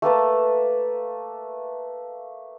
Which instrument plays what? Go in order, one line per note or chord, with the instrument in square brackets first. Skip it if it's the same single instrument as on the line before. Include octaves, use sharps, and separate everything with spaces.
[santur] A3 A#3 B4 A5